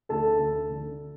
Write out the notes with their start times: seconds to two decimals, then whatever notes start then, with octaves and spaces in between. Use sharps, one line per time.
0.09 D2 A4 A5
0.39 D2
0.70 D3